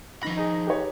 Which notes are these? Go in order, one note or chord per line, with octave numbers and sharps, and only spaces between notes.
D#3 F3 B5 A#6
D#4 G#4
G4 B4 C#5